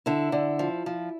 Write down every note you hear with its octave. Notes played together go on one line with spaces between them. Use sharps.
D3 E4
D3
F3
F3